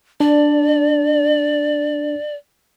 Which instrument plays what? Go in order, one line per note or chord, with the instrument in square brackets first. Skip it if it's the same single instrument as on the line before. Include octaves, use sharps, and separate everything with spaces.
[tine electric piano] D4 [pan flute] D5